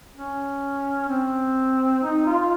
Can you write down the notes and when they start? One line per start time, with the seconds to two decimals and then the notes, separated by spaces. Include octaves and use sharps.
0.16 C#4
1.09 C4
2.03 D#4
2.26 F4